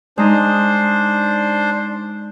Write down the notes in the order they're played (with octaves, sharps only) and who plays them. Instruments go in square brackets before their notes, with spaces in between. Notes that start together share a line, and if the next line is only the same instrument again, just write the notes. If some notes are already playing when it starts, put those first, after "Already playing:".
[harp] G#3 D#4 [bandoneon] D4 C5